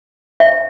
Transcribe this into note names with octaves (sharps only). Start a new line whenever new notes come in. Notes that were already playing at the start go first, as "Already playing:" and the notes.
E5